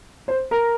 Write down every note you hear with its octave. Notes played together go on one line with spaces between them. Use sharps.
C5
A#4